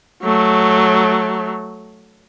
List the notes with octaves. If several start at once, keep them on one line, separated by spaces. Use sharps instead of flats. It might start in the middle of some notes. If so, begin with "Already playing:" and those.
F#3 A3